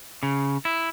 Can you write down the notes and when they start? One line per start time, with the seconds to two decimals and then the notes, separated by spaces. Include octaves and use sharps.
0.23 C#3
0.65 E4